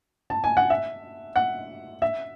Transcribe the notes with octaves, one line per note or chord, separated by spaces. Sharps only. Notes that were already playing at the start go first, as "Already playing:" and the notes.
A5
G#5
F#5
E5
F#5
E5